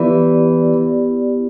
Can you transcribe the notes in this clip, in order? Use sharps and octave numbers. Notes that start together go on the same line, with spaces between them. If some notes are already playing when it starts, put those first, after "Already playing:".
Already playing: E3 B3 E4 G4 D5